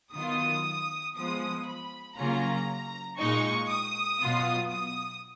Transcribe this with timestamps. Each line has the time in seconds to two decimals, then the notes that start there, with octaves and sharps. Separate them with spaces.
0.14 D#3 F#3 B3 F4 D#6
1.16 F3 G#3 B3 D#6
1.67 B5
2.17 C#3 F#3 A#3 C#4 F4 A#5
3.18 A#2 G#3 D#4 C#6
3.69 D#6
4.20 B2 F#3 B3 F4
4.71 D#6